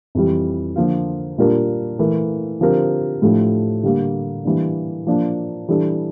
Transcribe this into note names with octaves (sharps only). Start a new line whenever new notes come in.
F2 E3 G3
D3 F3 A#3 F4
A#2 G3 D4 F4 A#4
E3 A3 E4 A#4
D3 F3 C4 G4 A#4
A2 F3 A3 D4 G4
D3 G3 A#3
E3 G3 A#3 D4
F3 A#3 D4
E3 G3 D4 A4